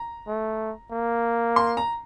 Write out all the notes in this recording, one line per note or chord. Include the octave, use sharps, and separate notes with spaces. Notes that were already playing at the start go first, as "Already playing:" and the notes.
Already playing: A#5
A3
A#3
C6
A#5